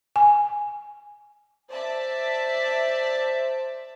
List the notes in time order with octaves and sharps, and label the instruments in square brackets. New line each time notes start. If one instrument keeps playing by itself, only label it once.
[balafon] G#5
[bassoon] C5 [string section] D5 E5 A5